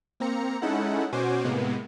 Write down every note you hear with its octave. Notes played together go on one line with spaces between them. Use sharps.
A#3 C4 A#5 C#7
G#3 C#4 D#4 E4 A4 F#5
B2 C#4 F#4 C5 G#5 D6
A2 C3 G#3 A#3 B3